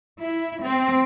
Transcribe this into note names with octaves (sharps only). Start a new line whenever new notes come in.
E4
C4